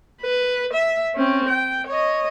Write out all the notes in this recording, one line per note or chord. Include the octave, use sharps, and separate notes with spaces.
B4
E5
C4 C#4
G5
C#5 D#5